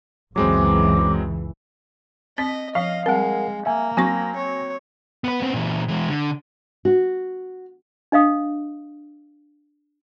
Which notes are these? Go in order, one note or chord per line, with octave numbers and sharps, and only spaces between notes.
F#1 C#2 E3 F#3 G#3 C4 D6
C4 D#5 B6
F3 D#5 F5
G3 G#3 C4 A#4 F#5
A#3 E5 G#5
F#3 C4 F#4 G#5 C#6 A#6
C#5
B3 B4
B3 C4
A#2 E3
E3 G#3
D3
F#4
D4 D#5 F5 D#6